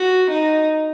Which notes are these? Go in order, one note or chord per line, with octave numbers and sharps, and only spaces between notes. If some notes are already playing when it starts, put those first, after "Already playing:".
Already playing: F#4
D#4